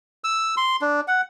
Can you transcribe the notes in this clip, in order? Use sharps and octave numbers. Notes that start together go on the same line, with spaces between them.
E6
C6
D4
F#5